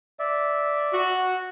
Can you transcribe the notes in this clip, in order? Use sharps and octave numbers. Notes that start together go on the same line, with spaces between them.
D5 E5
F#4